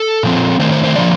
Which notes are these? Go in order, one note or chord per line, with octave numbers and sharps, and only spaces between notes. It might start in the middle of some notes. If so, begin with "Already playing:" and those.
Already playing: A4
A#2 F3 C4
D#3 A3 C4 C5
C5
C5
D3 F3 A#3 D5